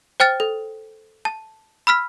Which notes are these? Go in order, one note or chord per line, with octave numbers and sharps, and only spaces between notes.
C5 G5 F6 A6
A4
A5
B5 E6 F6 B6